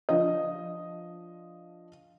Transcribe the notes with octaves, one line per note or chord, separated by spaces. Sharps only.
F3 D4 D#5